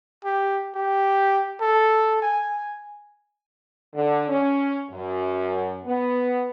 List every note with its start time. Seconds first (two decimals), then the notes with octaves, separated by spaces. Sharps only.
0.25 G4
0.75 G4
1.61 A4
2.22 G#5
3.95 D3
4.28 C#4
4.91 F#2
5.86 B3